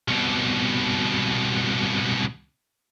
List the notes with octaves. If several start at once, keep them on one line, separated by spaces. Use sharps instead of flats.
C2 B2